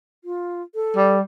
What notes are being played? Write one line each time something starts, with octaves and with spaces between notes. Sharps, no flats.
F4
A4
G3